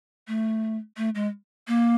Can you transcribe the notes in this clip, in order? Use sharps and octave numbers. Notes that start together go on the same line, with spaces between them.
A3
A3
G#3
A#3